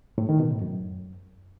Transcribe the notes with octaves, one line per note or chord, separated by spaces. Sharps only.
A2
D#3
B2
A2
F#2